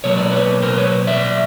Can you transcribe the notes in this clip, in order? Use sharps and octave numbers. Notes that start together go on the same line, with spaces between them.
B2 F#3 A#3 C#5
D5
B4 C#5
A#4 C5
B4 C#5
D5 E5